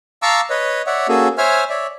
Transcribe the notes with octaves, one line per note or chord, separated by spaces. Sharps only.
F5 A5 A#5 C#6 D6 E6
B4 C#5 D#5
C#5 D5 E5 F#5
A#3 C#4 F#4 G#4 A4
C5 C#5 E5 G#5 F6
C#5 D5 E5